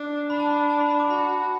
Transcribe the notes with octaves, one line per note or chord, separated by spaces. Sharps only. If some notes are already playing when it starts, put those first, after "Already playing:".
Already playing: D4
D4 B5
A5
B5
A5
B5
B5
D6
F#4 B5